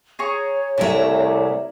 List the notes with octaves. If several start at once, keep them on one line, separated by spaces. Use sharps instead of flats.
G#4 C#5 A#5 C#6
C2 C3 A3 E4 A#4 D5